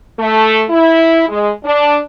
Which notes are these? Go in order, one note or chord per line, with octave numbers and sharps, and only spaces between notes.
A3
E4
G#3
D4